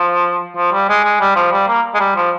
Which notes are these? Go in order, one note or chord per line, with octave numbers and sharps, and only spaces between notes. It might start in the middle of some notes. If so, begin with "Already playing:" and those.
Already playing: F3
F3
G3
G#3
G#3
G3
F3
G3
A#3
G#3
G3
F3